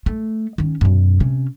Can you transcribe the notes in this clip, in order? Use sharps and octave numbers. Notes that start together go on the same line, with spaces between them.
A3
D#3 C#4
F#2 B2
C3 C#4